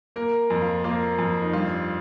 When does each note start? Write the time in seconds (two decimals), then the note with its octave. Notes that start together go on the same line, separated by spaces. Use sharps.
0.16 A#3 A#4
0.50 F2
0.62 F4
0.84 A#3 F4
1.18 F2
1.42 D#4
1.53 G2 F4